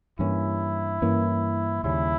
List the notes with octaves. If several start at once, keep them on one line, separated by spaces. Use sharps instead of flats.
G2 E3 A#3 C#4 E4
G2 E3 A#3 C#4
D#2 C#3 G3 C#4 E4